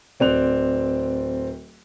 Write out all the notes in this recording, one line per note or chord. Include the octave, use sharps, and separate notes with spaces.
D1 C4 D5 F#6 F7